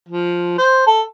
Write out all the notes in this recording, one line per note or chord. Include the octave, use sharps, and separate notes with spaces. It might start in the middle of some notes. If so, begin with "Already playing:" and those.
F3
C5
A4